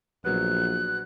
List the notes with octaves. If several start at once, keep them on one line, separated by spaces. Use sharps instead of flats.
A#1 F#3 B3 F#6